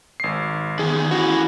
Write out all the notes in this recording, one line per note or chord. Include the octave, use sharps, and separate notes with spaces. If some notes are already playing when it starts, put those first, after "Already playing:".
G#1 C7
E2 D#3 G#4
E3 C#4 F#4